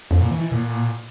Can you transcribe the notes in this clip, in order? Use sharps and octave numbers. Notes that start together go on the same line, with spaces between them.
F2
A#2
E3
E3
A#2